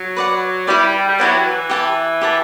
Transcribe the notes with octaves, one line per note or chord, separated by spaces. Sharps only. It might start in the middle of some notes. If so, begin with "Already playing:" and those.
Already playing: F#3
B4 D5 F#5
G3 E4 G4 B4 D5
G3
F#3 E4 G4 B4 D5
E3
G4 B4 F#5 A5
G4 B4 F#5 A5